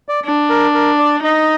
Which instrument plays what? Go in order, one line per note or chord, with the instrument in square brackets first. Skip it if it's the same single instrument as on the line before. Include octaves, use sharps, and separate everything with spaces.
[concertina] D5
[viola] D4
[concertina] A#4
A#4
D5
[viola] D#4 [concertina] D#5